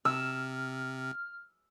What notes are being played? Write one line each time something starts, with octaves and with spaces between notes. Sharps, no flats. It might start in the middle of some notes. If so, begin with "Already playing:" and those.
C3 E6 F6